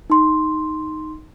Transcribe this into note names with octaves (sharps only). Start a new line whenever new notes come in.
D#4 C6